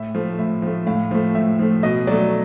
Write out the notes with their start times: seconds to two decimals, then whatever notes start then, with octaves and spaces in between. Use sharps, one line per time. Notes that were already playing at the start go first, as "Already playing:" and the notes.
Already playing: A2 E5
0.15 F3 A3
0.39 A2 E5
0.62 F3 A3
0.86 A2 F5
1.11 F3 A3
1.35 A2 E5
1.59 F3 A3
1.83 B2 D#5
2.07 F#3 A3 D5